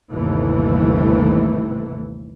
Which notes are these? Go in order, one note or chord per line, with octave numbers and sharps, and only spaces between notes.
G1 D#2 C3 E3 A3